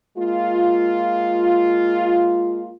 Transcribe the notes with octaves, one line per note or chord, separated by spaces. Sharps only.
G#3 A#3 F4